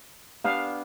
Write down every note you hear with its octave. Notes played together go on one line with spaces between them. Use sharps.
B3 D4 G4 F5